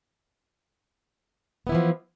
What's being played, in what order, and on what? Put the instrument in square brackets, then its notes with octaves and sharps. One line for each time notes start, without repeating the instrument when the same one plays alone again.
[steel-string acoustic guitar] B3
E4
E3
F3